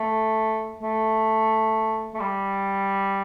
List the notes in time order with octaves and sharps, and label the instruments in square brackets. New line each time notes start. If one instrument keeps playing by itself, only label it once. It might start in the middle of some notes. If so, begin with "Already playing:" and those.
Already playing: [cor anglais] A3
A3
A3
G3